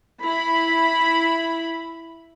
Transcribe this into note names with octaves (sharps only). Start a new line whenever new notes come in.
E4 B5